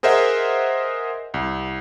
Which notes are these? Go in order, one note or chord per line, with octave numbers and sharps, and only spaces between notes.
G#4 A#4 C5 D#5 E5 F#5
C2